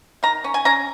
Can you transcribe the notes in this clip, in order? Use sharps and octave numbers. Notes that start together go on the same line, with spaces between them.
D#3 A#5
C#4
G#5
C#4 A#5